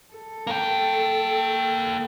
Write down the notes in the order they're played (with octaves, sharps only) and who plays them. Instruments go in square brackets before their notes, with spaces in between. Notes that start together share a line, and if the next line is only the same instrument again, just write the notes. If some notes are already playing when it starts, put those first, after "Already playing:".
[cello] A4
[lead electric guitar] A#3 G5